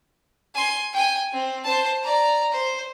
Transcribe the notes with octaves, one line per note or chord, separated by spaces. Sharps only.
G#5 C6
G5 G#5
C4
C5 A5
D5 A#5
C5